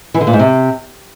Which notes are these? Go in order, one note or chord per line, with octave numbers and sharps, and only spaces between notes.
E3
D3
A#2
G#2
C3